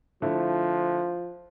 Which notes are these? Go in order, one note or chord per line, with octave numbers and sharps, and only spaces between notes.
D3 F3 A3 E4